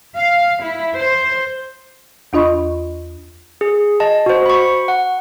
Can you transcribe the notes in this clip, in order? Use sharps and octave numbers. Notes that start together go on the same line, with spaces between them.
F5
E4
C5
E2 D4 F4 D#5 B5 C#6
G#4
D#5 A5
F#4 C5
B5 C#6
F#5